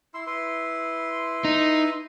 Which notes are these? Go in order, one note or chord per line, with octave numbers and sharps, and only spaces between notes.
E4 C6 E6
E4 B4 C6
D#4